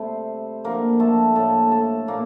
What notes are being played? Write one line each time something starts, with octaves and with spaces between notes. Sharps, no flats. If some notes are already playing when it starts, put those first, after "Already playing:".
Already playing: C3 G3 A3 C4 C5
D3 F3 A#3 C4 A#4
A3 A4
A2 G3 A3 A#3 A4
A3 A4
A#2 G3 A#3 A#4